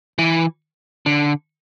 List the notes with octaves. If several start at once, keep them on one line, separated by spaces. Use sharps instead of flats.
E3
D3